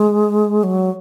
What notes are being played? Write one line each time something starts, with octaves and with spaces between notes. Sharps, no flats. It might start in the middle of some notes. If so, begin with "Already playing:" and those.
Already playing: G#3
F#3